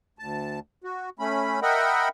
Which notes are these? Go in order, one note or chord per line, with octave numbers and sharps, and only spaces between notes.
D2 A5
F#4
A3 C#4 B5
A#4 D#5 E5 F#5 G5 B5